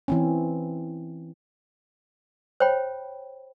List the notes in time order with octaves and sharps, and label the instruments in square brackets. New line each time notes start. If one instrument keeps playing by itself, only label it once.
[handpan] E3 C4 C#4
[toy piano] C5 C#5 G5 B5